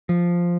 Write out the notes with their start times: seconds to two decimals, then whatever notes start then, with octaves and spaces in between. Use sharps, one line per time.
0.09 F3